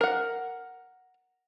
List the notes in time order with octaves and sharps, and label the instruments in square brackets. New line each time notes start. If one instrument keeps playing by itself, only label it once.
[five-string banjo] A#4 F#5